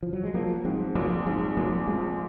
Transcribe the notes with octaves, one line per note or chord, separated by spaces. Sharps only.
F3
F#3
G#3
F3 F#3 A#3
G#2 G#3 C4
A#1 F#3 A#3
G#2 G#3 C4
A#1 F#3 A#3
F3 G#3 C4